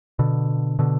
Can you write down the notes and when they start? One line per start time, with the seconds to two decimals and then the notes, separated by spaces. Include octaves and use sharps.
0.19 B2 D3
0.79 B2 D3